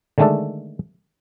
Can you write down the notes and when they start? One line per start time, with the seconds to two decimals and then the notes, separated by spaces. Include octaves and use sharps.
0.18 D3 D#3 G#3 A3 D4 A4